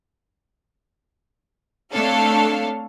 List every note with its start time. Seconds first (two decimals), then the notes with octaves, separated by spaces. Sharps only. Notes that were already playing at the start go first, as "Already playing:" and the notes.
1.93 A3 C4 D4 A4 C#5 F5